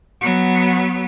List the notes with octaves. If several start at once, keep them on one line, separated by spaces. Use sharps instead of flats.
F#3 B3